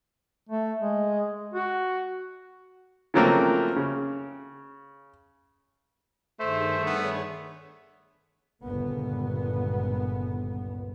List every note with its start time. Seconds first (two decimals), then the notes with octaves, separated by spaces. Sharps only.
0.49 A3
0.81 G#3
1.54 F#4
3.14 C#3 F3 F#3 A3 A#3 C4
3.76 C#3
6.40 G2 D#3 A3 G#4 C5
6.86 B3 D4 G#4 C#5
8.63 G1 C#2 A#2 B3